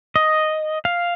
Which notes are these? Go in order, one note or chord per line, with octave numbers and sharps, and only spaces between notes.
D#5
F5